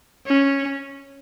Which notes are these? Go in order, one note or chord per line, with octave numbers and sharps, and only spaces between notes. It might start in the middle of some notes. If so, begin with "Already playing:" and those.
C#4